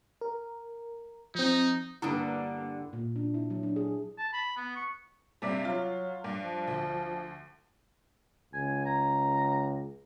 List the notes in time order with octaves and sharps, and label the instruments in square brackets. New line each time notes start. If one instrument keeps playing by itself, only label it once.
[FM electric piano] A#4
[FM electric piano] F3 C4 [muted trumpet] D#4
[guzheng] G2 D4 [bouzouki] D3 [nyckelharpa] A#3 A4 [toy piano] E4 D#6
[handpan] A#2
D4
E4
F#3
D4
G#4
[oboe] A5
B5
B3
C#6
[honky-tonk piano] G2 C3 G3
[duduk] F#3 [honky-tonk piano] F4
[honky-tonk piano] G2
[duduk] F3
[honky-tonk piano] D2
[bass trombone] C#2 [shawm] G#5
[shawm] A#5